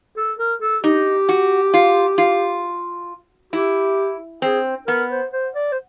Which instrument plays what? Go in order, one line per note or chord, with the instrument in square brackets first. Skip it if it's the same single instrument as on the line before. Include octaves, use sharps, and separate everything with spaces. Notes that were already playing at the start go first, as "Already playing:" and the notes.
[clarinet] A4
A#4
A4
[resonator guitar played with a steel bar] D#4 [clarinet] G4
[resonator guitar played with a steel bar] F#4
F4
F4
[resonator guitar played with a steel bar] E4 [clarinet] G4
[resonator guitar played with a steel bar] C4 [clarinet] G#4
[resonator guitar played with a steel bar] B3 [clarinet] A#4
[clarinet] C5
C5
D5
C5